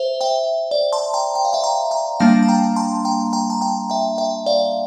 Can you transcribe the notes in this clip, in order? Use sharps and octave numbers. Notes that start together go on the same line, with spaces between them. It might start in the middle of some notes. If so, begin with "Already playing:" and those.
Already playing: C5 E5
E5 G5
D5
A5 C6
G5 A#5
G5
F5
E5 G5
G5 A#5
G5 A#5
G3 A#3 D4 F5 A5
A5
G5 A#5
A5 C6
G5 A#5
G5 A#5
A5
G5 A#5
E5 G5
E5 G5
D5 F5